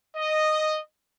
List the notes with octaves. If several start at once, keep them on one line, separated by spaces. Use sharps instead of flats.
D#5